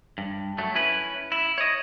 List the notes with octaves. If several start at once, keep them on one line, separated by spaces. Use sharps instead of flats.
G2
F#3 A3
C#4 E4 B4
E4
C#5 D#5